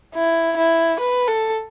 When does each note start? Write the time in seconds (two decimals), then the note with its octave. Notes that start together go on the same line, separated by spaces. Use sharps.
0.15 E4
0.57 E4
1.00 B4
1.28 A4